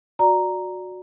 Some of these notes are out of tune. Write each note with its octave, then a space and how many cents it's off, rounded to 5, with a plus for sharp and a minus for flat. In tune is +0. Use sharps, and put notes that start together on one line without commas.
F#4 -15 D5 +0 A#5 +0